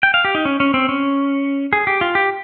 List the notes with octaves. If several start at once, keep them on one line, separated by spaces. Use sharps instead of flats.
G5
F5
G4
D#4
C#4
C#4
C4
C#4
G#4
G4
F4
G4